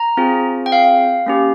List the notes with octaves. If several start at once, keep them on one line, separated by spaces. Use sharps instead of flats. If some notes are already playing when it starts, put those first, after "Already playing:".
Already playing: A#5
C4 F4 G#4
G5
F5
A#3 C#4 G4